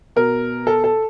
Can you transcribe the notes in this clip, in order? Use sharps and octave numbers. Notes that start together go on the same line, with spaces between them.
B2 A#4
A4
A4